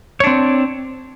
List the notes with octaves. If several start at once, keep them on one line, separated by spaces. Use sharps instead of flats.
C4 D4 C#5